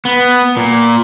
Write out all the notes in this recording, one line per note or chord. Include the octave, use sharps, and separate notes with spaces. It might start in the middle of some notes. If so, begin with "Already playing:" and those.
B3
A#2